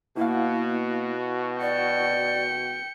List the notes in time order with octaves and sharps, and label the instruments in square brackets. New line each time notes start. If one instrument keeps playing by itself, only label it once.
[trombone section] B2 F#4 [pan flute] A#3 [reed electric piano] E4 F5
[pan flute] D5 [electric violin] G5 C#7